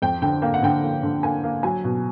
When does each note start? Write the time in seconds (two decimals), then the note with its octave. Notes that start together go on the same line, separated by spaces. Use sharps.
0.02 F2 G5
0.22 D3 G5
0.42 A#3 G5
0.54 F#5
0.62 D3 G5
0.83 A#3
1.03 D3
1.23 A#3 G#5
1.44 A#3
1.63 F#3 G#5
1.84 B2